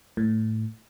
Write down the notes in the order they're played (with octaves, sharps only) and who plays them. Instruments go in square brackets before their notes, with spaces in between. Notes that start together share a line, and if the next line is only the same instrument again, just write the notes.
[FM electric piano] A2